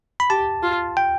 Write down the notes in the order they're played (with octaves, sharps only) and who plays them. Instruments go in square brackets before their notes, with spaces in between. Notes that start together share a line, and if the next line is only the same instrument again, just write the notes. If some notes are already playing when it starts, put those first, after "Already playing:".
[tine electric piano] B5
[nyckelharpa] G4 [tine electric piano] A5
[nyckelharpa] F4
[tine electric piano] G5